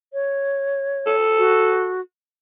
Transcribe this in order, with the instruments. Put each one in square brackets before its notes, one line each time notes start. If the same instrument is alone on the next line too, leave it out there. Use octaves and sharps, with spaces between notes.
[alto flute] C#5
[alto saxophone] A4
[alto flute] F#4